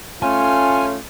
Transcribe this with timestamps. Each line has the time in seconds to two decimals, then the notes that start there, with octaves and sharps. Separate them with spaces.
0.22 A3 C#4 F4 G#5